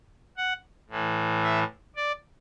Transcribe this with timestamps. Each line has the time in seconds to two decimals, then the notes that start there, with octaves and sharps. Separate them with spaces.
0.37 F#5
0.90 A2 E3
1.43 E5
1.96 D5